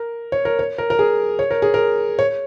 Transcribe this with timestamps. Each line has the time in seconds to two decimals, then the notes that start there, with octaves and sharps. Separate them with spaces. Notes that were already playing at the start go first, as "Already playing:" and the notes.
Already playing: A#4
0.32 C#5
0.45 A#4
0.59 C#5
0.78 A#4
0.90 A#4
0.99 G#4
1.39 C#5
1.51 A#4
1.62 G#4
1.74 A#4
2.19 C#5